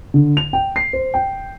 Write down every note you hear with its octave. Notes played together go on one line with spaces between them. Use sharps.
D3
F7
G5
C7
C5
G5